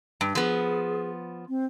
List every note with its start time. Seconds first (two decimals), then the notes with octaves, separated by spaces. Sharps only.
0.21 G2
0.35 F3 B3 G#4
1.49 C4